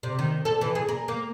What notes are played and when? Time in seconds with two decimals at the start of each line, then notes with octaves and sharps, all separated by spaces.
0.03 C3
0.19 D#3
0.45 A4
0.61 E3
0.75 G#4
0.88 A#4
1.08 A#3